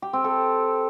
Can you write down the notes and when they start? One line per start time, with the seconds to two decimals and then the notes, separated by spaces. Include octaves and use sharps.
0.02 G4
0.13 C4
0.24 A4